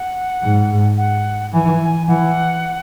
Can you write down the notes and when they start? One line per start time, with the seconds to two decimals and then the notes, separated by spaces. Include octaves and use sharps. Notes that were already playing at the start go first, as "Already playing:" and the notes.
Already playing: F#5
0.43 G#2
0.98 F#5
1.53 E3 G#5
2.08 E3 F#5